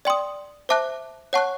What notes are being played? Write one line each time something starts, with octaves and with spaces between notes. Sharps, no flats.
D5 G5 C6 D#6
C5 E5 A5 D6 F#6
C#5 F#5 A5 C#6 F#6